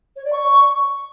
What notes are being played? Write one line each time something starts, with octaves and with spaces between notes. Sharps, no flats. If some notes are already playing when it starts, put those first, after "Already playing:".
C#5
D5
C#6